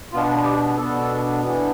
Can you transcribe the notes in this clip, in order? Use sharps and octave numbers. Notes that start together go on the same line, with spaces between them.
B2 B3 D4 F4
G4
B2 B3 D4 A4
E3 B3 D4